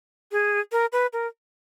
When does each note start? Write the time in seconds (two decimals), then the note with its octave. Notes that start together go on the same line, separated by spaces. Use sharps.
0.32 G#4
0.72 A#4
0.92 B4
1.13 A#4